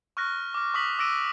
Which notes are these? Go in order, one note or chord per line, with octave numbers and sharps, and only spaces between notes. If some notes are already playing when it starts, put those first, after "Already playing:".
C#6 F6 F#6 A#6
D6 F6
C#6 D#6 B6 F#7
D6 E6 A#6 D7 D#7